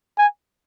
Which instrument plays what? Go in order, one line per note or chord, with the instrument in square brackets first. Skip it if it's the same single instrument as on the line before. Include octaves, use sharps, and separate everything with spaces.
[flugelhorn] G#5